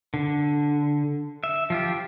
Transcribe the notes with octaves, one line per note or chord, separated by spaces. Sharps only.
D3
E5
F3 F4 G4